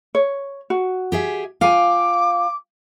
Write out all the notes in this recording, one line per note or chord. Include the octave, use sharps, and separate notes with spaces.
C#5
F#4
G4 G#4 E5
F4 F5 G5 G#5 D6